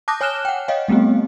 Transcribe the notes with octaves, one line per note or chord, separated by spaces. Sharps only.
A5 D6 D#6 F#6 G6 A#6
C#5 G#5 F6 F#6 E7 G7
F#5 G5
C#5 D#5 F5 G5
G3 A3 B3 C4 G4